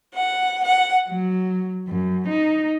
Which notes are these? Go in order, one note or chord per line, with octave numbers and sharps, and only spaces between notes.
F#5
F#5
F#3
F#2
D#4